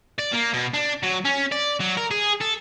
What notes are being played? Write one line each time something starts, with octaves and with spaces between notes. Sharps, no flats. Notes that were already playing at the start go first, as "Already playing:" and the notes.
D5
A#3
B2
D4
F#3
C#4
D5
F#3
A#4
G#4
A4